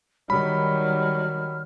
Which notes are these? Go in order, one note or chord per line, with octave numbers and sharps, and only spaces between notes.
D#3 F#3 G3 B5 F6